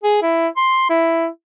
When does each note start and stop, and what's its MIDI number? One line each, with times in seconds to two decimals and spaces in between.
0.04 0.18 68
0.22 0.48 64
0.57 0.87 84
0.90 1.28 64